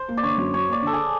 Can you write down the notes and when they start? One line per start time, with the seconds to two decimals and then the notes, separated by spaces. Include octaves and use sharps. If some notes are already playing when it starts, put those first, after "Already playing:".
Already playing: C5
0.09 A#3
0.17 D5
0.23 D3 C#5
0.38 F#2
0.53 F#3 C#5
0.68 A#3 D5
0.82 D3 A4
0.93 G#4